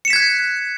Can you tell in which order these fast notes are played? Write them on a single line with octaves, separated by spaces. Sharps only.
C#7 E7 B6 G#6 F#6